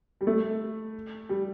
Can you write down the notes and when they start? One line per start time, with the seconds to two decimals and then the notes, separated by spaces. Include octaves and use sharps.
0.21 G3
0.27 A3
1.29 G3